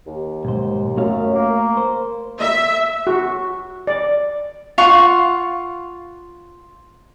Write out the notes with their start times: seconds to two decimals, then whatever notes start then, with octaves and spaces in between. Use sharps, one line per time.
0.07 D#2
0.45 B1 G#2 C5
0.97 F#2 A3 F5
1.34 A#3
1.77 C5
2.42 E5
3.07 F#4
3.87 D5
4.78 F4 F5 F#5 C#6